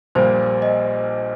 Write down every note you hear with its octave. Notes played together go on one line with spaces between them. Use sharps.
A#1 A#2 G3 A#3 C5
D#5